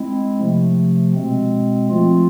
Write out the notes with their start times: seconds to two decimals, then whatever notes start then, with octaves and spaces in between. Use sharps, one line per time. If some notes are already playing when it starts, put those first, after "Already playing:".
Already playing: G#3 C4 E4
0.39 C3 F3 A3
1.14 B2 G#3 C4
1.89 F3 A3 C4 F4